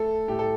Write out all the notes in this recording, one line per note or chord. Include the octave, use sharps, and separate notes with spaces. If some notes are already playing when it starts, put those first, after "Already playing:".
Already playing: A3 A4
A2 G4
A4